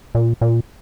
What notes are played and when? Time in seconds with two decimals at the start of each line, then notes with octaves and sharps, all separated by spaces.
0.15 A#2
0.41 A#2